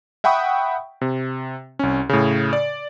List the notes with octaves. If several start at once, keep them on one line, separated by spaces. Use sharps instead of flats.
E5 F#5 G5 B5 C#6 D#6
C3
C2 C#4
A2 C#3
D5